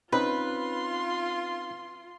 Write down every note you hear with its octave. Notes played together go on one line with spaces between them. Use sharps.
C4 C#4 D#4 F4 B4 C6